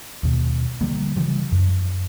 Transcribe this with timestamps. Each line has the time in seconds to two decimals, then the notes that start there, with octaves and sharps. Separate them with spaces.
0.23 D#2 B2
0.81 D3 F3 G3 A#3
1.16 C#3 E3 F3 G3
1.52 F#2